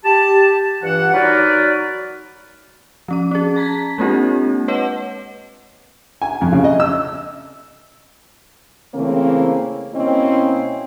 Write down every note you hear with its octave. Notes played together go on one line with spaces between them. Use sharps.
G4 A5
G2 E3 F4 F#5
F#3 D#4 F#4 A#4 B4 D5
F3 C#4 D6
C#4 G#4
A5 A#5 G#6 B6
G#3 A#3 C4 D4 F4 G4
B4 C#5 D#5 F#5 A5
G#5
F2
C#3
D#5
E6
C#3 E3 A3 A#3 C4
B2 A#3 C4 C#4 E4 D#5